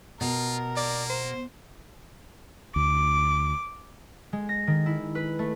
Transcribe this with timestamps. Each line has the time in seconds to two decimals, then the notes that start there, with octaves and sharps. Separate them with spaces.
0.21 B2 F4 A#4
0.77 A#3 D5
1.10 C5
2.76 D2 D6
4.33 G#3
4.49 A#6
4.67 D#3
4.86 E4
5.15 B4
5.39 A3